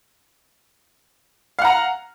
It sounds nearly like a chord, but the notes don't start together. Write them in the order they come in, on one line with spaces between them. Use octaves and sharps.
F5 F#5 A#5